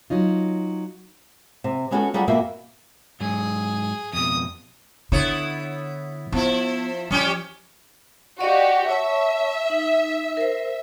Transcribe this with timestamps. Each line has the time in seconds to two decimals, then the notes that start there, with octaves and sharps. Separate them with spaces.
0.10 F#3 C#4 D#4 F4
1.64 C3
1.91 G#3 B3 C#4 F#4 G4 A4
2.14 F#3 G3 F4 G#4 F#5
2.28 F2 B2 A#3 F#4 E5
3.20 G#2 F#3 G#4
4.13 F2 B2 D#6
5.12 D3 B3 E4 C#5
6.32 F3 B3 E4
7.11 F3 G3 C#4 G4
8.40 F#4 G4 D5 D#5 F5
8.89 C#5 E5 A5 C#6
9.70 D#4
10.37 A#4 C5